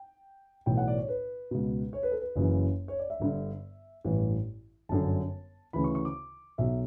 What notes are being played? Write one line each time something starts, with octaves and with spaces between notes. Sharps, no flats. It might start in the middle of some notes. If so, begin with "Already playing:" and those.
Already playing: G5
B1 A2 E3 G5
F#5
D5
C#5
B4
C#2 B2
C#5
B4
A4
B4
F#1 F#2 C#3 E3
C#5
D5
E5
G1 G2 D3
A1 G2 E3
G1 F#2 D3 A5
D2 C#3 E3 B5
C#6
C#6
D6
B1 B2 E5